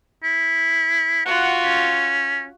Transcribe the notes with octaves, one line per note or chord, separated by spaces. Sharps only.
E4
F4 F#4 F#5
C#4